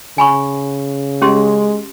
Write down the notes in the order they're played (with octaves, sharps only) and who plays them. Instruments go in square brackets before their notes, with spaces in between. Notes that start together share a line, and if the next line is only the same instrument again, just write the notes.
[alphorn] C#3 [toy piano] G#5 B5 C#6
[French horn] G#3 [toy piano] C#4 G4 C6